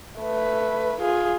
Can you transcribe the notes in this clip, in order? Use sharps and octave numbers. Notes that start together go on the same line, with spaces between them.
A3 B4
F4 G#4